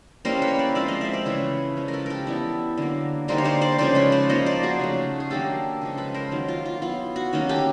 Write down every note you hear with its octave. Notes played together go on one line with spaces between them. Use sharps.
G3 A#3 C#4 E4 A#4 C5
B4 C#5
C5 D5
F3 G#3 C4 D5 E5
D#5 F5
D5 E5
C5 D5
C#3 E3 A3 C#4 B4 C#5
F3 G#3 C#4 F4
A#4
A4 B4
G4 A4 A#4
E3 G3 B3 E4
D3 F#3 A#3
D3 G3 A#3 D#4 A#4 C5
C#5
C5 D5
C5 D5
C#3 F3 G#3 C#4 C5 D5
B4 C#5
C5 D5
F3 A#3 D#4 C#5 D#5
C5 D5
F#4 G#4
C#3 F#3 A3
G#4
D#3 F#3 A#3 D4 G4 A4
C#3 F3 G#3
A4 B4
A#4 C5
D#3 F#3 A#3
F4
F4
F#3 B3 E4 F4
F#4
D#3 F#3 A#3 C#4
G4 A4